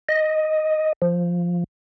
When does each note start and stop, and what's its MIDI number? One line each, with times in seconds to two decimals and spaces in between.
0.09 0.93 75
1.02 1.64 53